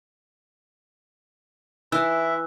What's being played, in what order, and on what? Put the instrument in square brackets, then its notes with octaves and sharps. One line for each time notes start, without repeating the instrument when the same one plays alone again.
[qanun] E3 [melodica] E4 E5 [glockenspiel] E6 F#6